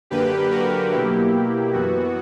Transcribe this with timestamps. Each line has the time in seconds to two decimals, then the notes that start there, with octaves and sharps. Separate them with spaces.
0.10 F#2 D3 A#3 G4 B4
0.51 F#4 A#4
0.91 B2 F#3 A#3 E4 G4
1.73 F#2 E3 B3 F#4